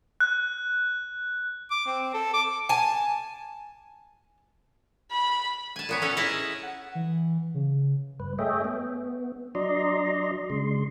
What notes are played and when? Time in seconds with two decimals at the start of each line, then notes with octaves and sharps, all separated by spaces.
0.20 F#6
1.71 D6
1.86 C4
2.14 A4
2.34 D6
2.69 G#5 A5
5.12 B5
5.76 G#5 A5
5.89 A#2 B3 C#5
6.02 C#4 A4 F#5
6.17 E4 G#4 D#5 A5 A#5
6.63 F#5
6.95 E3
7.54 C#3
8.20 G2 B4
8.39 A3 G#4 C#5 D#5 E5 G5
8.64 B3
9.55 F#3 D4 D5 D#5 A#5 C6
10.50 C#3 G#3 C6